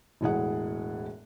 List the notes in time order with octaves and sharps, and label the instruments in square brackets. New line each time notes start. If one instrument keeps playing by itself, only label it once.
[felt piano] E1 A2 G#4 F#5